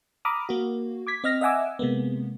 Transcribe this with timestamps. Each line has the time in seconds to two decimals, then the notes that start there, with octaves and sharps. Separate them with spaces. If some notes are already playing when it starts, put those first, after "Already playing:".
0.25 A#5 B5 D6 D#6 F6
0.49 A#3 F#4
1.07 D6 G#6 B6
1.24 C4 D#5 F6 A#6
1.41 D#5 E5 F#5 G#5 D6 E6
1.79 C3 G#3 A#3 B3